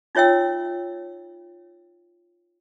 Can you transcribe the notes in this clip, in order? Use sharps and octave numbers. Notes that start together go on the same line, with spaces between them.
D#4 F4 C#5 E5 G5 E6